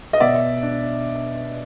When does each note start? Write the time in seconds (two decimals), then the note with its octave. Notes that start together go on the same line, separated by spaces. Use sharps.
0.13 D#5
0.20 B2 D5 E5
0.63 D4